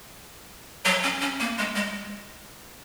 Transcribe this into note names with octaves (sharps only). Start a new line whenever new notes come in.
F#3
C#4
C#4
A#3
G#3
G#3